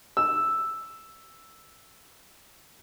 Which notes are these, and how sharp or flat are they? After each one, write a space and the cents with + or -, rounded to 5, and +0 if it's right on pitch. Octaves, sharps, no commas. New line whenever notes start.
E6 +0